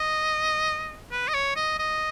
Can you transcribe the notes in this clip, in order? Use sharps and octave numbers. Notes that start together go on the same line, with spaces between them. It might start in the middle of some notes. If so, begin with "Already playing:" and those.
Already playing: D#5
B4
D#5
C#5
D#5
D#5